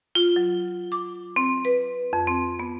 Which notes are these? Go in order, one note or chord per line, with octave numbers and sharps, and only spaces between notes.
F4
F#3
D6
C4
B4
F2
C4
B3